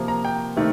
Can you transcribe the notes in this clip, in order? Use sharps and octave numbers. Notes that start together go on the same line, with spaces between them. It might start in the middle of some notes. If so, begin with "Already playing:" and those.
Already playing: C3 F3 A#3
A#5
G5
C3 D#3 A3